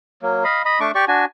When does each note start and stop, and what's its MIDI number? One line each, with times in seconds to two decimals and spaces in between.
0.22 0.44 54
0.22 0.44 58
0.44 0.62 75
0.44 0.62 77
0.44 0.62 83
0.65 0.79 75
0.65 0.79 83
0.80 0.91 57
0.80 0.91 62
0.80 0.91 85
0.80 0.91 86
0.95 1.05 67
0.95 1.05 74
0.95 1.05 85
1.08 1.25 62
1.08 1.25 66
1.08 1.25 80